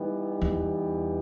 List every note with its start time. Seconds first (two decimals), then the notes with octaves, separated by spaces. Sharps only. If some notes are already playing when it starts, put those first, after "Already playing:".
Already playing: E3 G3 B3 D#4 G4
0.41 E2